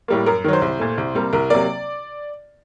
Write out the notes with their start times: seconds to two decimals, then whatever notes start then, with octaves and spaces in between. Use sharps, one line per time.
0.08 A2 G3 A#3
0.26 F#2 A#4
0.44 D#3 A#4
0.48 F#3 C5
0.62 C2
0.80 A#2 A3
0.98 C2
1.15 C3 G3 A#3
1.33 C2 A#4
1.50 C3 F#3 A#3 D5